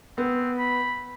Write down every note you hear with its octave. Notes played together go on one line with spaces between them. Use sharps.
B3 C4
B5